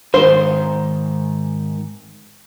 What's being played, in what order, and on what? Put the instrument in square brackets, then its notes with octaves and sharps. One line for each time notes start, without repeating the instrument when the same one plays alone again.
[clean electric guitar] G#2 D#3 [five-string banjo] C5